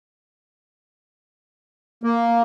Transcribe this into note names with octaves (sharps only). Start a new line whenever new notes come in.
A#3